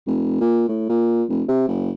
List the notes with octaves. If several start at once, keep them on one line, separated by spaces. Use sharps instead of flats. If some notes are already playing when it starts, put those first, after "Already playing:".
F1
A#2
A2
A#2
F1
C3
F#1